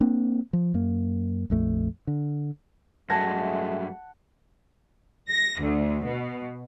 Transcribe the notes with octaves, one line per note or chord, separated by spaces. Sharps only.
A#3 C4 D4
F3
F#2 A#3
A#1 F2 A3
D3
G2 F#3 G#3 A3 F#5 A5 G#6 A#6
A#6
D2
B2